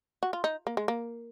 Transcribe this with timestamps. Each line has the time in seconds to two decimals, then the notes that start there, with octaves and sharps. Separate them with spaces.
0.23 F#4
0.33 F4
0.44 D#4
0.67 A#3
0.77 G#3
0.88 A#3